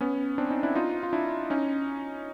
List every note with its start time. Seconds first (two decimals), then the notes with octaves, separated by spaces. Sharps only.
0.01 B3 C#4
0.38 C4 D4
0.50 C#4 D#4
0.63 D4 E4
0.75 D#4 F4
1.03 F4
1.13 D4 E4
1.50 C#4 D#4